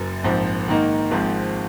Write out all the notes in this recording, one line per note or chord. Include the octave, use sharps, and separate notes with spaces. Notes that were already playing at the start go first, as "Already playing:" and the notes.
Already playing: F#1 F#2
A#1 G#2 F3 C4
G#2 D#3 A#3 D#4
G#1 G#2 F3 G#3 C4